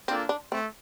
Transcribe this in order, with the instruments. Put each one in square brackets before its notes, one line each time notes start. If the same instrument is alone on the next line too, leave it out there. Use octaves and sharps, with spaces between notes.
[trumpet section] A#3 D4 F4 A4 D5 [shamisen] C4
[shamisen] D4
[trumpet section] A3 [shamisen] C4